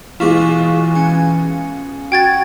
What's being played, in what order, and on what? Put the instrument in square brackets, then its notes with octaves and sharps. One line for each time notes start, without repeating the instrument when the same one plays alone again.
[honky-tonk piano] B2 G#3 F4 [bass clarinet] E3 [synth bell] E4 C#6 D6
[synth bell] C#4 G#5
[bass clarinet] F#4 [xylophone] G5 G#6 A6